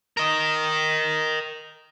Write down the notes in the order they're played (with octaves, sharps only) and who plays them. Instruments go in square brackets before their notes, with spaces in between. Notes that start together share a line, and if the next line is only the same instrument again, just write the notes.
[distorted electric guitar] A#4 D#5